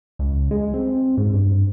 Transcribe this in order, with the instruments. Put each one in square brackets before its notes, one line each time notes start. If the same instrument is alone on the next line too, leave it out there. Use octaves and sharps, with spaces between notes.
[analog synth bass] C#2
G#3
C4
G#2
G2